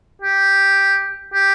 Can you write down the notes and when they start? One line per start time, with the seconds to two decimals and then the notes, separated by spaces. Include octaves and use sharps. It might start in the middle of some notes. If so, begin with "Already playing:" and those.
0.22 G4
1.34 G4